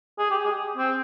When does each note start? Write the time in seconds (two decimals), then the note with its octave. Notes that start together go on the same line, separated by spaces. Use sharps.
0.19 G#4
0.30 G4
0.45 G#4
0.77 C4